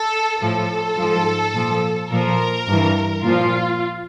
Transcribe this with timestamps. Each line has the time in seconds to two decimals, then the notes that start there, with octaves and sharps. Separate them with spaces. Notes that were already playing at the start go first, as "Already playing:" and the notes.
Already playing: A4
0.41 A2 F3 A4
0.98 G#2 F3
1.54 A#2 F3
2.10 A#2 F3 A#4
2.68 G2 E3
3.23 A#2 F3 F4